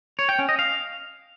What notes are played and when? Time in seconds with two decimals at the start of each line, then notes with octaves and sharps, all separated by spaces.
0.19 C#5
0.29 G5
0.39 C#4
0.49 D#5
0.59 F5